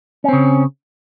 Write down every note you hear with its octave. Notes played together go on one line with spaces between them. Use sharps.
C#3 C4 C#4